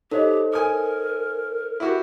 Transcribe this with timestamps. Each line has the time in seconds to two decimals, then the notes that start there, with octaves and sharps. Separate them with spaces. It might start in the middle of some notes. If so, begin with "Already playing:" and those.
0.12 D#4 G4 A4 C5 C#5 D#5
0.53 A#4 G#5 D#6
1.80 E4 F#4 G4